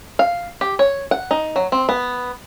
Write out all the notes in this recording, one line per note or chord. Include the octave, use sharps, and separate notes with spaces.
F5
G4
C#5
F#5
D#4
F#3
C4
B3